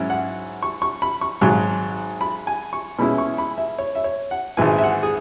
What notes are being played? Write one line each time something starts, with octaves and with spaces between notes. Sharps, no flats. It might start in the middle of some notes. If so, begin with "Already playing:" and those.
Already playing: G#2 F#3 C#4 E4
F#5
C#6
C#6
B5
C#6
G#1 G#2 F#3
B5
G#5
C#6
B2 G#3 C#4 E4 B5
C#6
B5
E5
C#5
E5
C#5
F#5
G#1 G#2 E3 G#5
E5
F#5
G#4